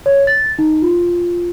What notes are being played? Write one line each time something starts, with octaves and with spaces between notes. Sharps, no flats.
C#5
A6
D#4
F4